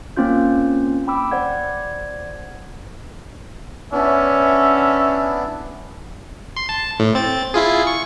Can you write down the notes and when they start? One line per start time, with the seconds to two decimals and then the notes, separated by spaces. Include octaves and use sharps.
0.17 A#3 C4 C#4 F4 G6
1.07 G5 B5 D6 E6
1.31 C5 D5 F#5 G#6
3.93 B3 C#4 D4 E4 E5
6.56 C6
6.69 A5
7.00 A2
7.15 C4 A6
7.54 E4 F4 G#4
7.87 C#6